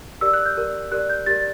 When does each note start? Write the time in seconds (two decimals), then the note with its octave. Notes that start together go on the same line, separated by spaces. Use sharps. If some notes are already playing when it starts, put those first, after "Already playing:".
0.21 G4 A#4 D5 E6
0.33 F#6
0.45 G6
0.57 G4 A#4 D5
0.92 G4 A#4 D5 F#6
1.09 G6
1.26 G4 A#4 D5 A6